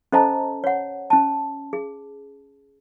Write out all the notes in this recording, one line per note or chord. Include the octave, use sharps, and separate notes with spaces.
C#4 A4 C5 D#5 A5 A#5
C#5 F#5
C#4 A5
G#4